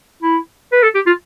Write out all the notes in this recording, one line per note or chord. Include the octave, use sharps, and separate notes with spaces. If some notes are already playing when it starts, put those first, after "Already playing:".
E4
B4
A4
G4
F4